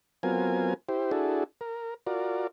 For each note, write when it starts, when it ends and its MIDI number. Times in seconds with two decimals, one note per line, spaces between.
0.23 0.74 54
0.23 0.74 59
0.23 0.74 60
0.23 0.74 65
0.23 0.74 70
0.23 0.74 80
0.89 1.11 64
0.89 1.11 67
0.89 1.11 72
1.11 1.44 62
1.11 1.44 64
1.11 1.44 66
1.11 1.44 68
1.11 1.44 69
1.61 1.94 70
2.07 2.47 65
2.07 2.47 66
2.07 2.47 70
2.07 2.47 74